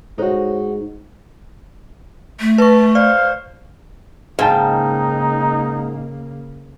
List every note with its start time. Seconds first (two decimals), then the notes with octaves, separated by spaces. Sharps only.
0.18 G#2 D#4 F#4 A4 C5 C#5
2.40 A3
2.58 B4 A5 C#6
2.95 C5 D5 F5
4.39 G#2 C#3 A#3 D#4 F5 G5 A5